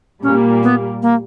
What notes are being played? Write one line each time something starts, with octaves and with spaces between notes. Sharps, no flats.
A#2 G3 A#3 C#4
B3
A#3